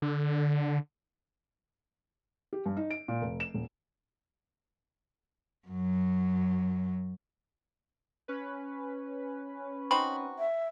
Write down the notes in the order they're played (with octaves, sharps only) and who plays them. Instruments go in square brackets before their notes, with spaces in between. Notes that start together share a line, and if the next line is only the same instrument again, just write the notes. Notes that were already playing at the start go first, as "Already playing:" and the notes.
[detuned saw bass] D3
[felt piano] G4
G2
D#4
D7
A#2
F1
E7
D#1
[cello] F#2 F#3
[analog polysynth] C#4 B4
[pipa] C4 D#4 F#4 [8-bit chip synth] B5
[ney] E5